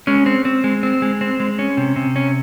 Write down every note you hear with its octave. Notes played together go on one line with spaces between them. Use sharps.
G#3 C#4
C4
C4
G#3
C4
G#3
C4
G#3
C#4
C3
C3
C#4